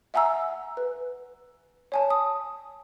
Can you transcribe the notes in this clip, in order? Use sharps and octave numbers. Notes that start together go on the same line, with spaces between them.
E5 F#5 G#5 A#5 E6
B4
C#5 G#5 A5
D#6